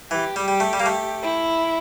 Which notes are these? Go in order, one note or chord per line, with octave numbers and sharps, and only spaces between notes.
E3 G4
G3
G3
A3
G3
A#3
A3
E4